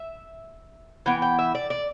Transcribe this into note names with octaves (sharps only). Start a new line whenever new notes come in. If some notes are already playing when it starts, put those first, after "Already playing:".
Already playing: E5
E3 B3 G5
G5
E5
D5
D5